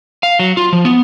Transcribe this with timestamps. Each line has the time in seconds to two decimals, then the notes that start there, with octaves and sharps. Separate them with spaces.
0.23 F5
0.39 F#3
0.57 F4
0.73 F3
0.85 B3